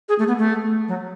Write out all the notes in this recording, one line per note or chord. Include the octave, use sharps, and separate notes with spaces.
G#4
A3
B3
A3
F#3